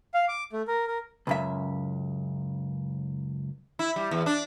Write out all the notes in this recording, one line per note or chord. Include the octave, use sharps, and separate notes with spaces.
F5
D6
A3
A#4
A#4
C#2 F#2 E5
E4
G3
E2
D4